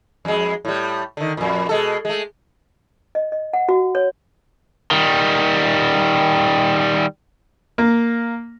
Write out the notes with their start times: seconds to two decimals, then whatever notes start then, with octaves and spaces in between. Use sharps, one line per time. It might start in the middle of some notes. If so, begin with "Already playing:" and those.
0.25 F2 G#3
0.65 A2 G3
1.17 D3 D#3
1.37 F2 A#2
1.69 B2 G#3 A4
2.05 G#3 A3
3.15 D#5
3.32 D#5
3.53 F#5
3.69 F#4
3.95 C#5
4.91 D#3 G3
7.78 A#3